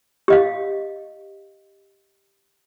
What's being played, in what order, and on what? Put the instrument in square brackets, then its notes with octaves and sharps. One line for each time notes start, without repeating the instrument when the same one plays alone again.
[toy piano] G4 D#5 F5